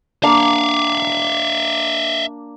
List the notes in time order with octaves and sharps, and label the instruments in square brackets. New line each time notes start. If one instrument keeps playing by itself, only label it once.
[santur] A#3 D4 [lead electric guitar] E5 F5